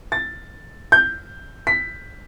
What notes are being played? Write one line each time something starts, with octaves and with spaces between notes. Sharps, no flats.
A6
G6
B6